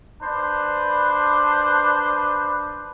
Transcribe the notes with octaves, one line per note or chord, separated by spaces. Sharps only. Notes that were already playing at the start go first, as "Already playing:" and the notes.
D4 B4 C5